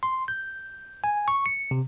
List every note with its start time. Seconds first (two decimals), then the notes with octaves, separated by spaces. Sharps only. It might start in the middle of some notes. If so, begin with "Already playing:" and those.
0.03 C6
0.28 G6
1.04 G#5
1.28 C#6
1.46 C#7
1.71 C3